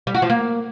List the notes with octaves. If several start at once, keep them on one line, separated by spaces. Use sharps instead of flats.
G3
F#4
F3
A#3